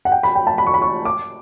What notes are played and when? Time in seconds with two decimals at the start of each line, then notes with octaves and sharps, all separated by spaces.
0.05 F#5
0.12 G5
0.23 B5
0.35 G5
0.47 A5
0.58 B5
0.67 C#6
0.74 B5
0.82 C#6
1.05 D6